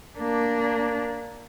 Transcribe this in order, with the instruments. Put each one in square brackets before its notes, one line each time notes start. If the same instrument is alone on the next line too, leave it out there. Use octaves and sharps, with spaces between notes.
[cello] A#3 D4